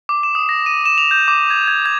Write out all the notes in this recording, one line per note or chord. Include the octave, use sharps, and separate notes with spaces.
D6
E7
D#6
A#6
D#7
E7
F7
G6
D6
G#6
G#6
G#6